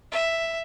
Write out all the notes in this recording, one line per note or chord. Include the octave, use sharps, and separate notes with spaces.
E5